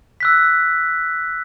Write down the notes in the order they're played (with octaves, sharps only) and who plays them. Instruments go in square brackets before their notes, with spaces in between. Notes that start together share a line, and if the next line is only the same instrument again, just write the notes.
[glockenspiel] E6 F#6 B6